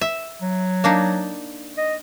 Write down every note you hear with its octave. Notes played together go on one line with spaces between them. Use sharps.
E5
F#3
A#3 D4 D#4
D#5